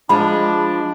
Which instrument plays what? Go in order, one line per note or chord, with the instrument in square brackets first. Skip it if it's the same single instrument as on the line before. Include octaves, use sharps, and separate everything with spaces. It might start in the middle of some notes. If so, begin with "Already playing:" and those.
[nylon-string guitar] F3 G#3 [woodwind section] D4 [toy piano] B5